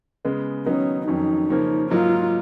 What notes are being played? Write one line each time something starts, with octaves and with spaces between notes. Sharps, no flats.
C#3 G#3 B3
D#3 F#3 B3 C#4 D#4
F2 D#3 F#3 C#4 D#4
C#3 F3 A#3 C#4
G#2 F#3 A#3 D#4 F4